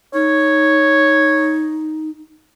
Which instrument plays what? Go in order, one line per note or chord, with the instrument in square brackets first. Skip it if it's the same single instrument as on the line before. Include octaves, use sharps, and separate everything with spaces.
[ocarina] D#4 [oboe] C#5